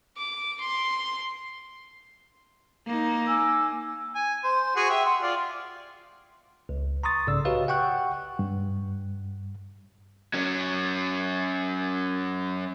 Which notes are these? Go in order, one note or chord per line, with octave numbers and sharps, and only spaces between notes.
D6
C6
A#3 D#4
G#5 D6 E6
G#5
C5
F#4 G#4 F#5
G4 E5
F#5 C6
F4 D5
C#2
A#5 C6 C#6 D#6 A6
B1 G#2 C#3 D5 E6
F#4 G4 B4 C#5 D#5 F5
F#5 G5 C#6 F#6
G2
F#3 C#4